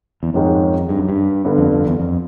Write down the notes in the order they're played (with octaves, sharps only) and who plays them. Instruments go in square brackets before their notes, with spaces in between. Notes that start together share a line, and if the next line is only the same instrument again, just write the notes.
[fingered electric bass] E2
[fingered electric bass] F2 [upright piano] G#2 D#3 G#3 C#4
[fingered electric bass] G2
F#2
G2
[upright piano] G1 G2 D3
[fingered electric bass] F2
F2
E2
F2